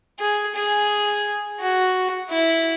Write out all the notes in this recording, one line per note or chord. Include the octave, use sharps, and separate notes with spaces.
G#4
G#4
F#4
E4